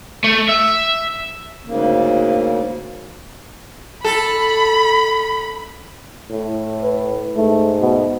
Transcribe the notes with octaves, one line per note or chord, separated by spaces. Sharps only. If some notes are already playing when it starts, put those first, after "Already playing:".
A3
E5
D2 G#2 C#3 A#3
A4 B5
A2
B4
G#2 A3
B2